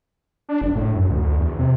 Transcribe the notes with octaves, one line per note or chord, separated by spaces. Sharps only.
D4
F#1
A2
F#2
D2
D2
E2
C3